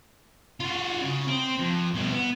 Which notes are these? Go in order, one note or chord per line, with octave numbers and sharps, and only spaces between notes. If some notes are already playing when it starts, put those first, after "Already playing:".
F4 F#4
C#3
C4
F2
B2 G3
B3